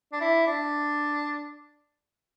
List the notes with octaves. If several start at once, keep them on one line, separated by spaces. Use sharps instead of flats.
D4
E4
D4